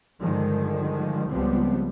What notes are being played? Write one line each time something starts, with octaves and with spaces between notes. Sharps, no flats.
G2 D3 D#3 F3 G#3
C#2 F3 G3 B3 C4